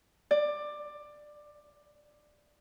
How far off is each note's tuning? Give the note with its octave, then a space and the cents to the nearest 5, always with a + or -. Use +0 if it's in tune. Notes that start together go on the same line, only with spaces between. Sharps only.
D5 +15